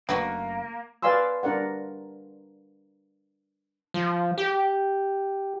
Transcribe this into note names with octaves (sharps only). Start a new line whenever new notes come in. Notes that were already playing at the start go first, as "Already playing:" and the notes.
F#1 A3 A#3 D4 F#4 B4 F5
B4 D5 F5 G#5 C6 E6
D4 A#4 D5 F#5
F3
G4